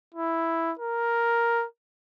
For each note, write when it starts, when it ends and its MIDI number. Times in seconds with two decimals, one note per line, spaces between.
0.14 0.72 64
0.79 1.65 70